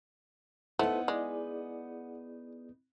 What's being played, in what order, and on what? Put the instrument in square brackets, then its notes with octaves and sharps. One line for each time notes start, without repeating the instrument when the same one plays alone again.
[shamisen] A3 [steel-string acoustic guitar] B3 D#4 [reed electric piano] E4 B4 C5 [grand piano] F#5
[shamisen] G#3 [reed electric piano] E4 G#4 D5